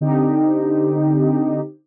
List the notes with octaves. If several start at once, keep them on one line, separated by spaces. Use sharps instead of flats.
D3 C4 D#4 G4